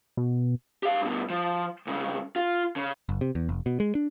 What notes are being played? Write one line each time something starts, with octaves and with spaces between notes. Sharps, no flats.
B2
G4 F5
G2 B2
F3
C2 C#3
F4
C#3
F#1
C3
E2
F1
B2
G#3
D4